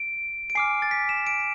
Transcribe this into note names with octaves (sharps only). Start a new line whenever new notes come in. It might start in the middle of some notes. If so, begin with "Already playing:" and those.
Already playing: D7
D7
G#5 D6 F6 C7
A6
B6
E7
D7